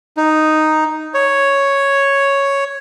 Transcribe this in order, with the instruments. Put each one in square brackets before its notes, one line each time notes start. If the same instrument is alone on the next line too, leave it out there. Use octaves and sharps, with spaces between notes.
[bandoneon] D#4
C#5